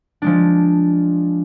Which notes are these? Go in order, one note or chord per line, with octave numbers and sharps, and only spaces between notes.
F3 G#3 D4